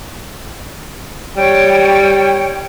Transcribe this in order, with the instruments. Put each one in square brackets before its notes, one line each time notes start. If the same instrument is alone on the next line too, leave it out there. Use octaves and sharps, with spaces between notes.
[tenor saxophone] G3 [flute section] C#5 G5